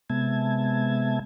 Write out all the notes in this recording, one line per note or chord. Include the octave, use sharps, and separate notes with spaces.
C3 G#3 B3 E5 A5 G#6